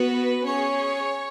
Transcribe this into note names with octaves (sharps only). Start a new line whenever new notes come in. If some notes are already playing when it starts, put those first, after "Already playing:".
Already playing: B3 F#4 B4
C#4 G#4 C#5